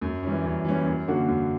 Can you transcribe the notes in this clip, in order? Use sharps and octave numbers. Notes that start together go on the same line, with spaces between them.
F#2
E3 G3 C#4
F#2
E3 G3 C#4
F#2
D3 A#3 C#4 F#4
F#2